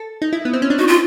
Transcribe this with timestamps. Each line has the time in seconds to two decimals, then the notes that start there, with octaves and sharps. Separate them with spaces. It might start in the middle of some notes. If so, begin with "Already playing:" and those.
Already playing: A4
0.22 D#4
0.33 E4
0.45 B3
0.53 C4
0.62 C#4
0.70 D4
0.79 D#4 F#4
0.88 F4